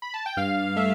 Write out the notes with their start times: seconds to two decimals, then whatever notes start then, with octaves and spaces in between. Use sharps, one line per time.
0.02 B5
0.14 A5
0.26 G5
0.37 G2 F5
0.76 A3 E5